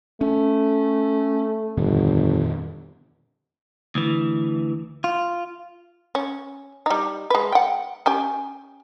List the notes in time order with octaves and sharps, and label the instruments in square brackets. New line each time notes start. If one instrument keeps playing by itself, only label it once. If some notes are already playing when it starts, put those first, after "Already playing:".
[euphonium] A3 [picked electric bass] C#4
[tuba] G1 [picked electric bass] F2 A#2 D#3
[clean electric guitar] D2 E3
F4
[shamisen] C#4
G3 D#4
G#3 B4
F#5 G5
C#4 G4 G#5